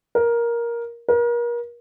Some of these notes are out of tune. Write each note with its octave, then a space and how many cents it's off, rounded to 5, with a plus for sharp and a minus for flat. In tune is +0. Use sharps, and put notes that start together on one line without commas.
A#4 +10
A#4 +35